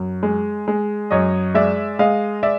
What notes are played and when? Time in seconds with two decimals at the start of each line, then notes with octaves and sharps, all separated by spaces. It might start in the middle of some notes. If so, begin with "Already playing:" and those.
Already playing: F#2
0.23 G#3
0.68 G#3
1.11 F#2 C#5 D#5
1.54 G#3 D5 E5
1.99 G#3 D#5 F5
2.43 D5 E5